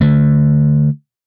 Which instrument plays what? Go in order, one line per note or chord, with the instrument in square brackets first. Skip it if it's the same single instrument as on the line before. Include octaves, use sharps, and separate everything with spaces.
[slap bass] D3 A3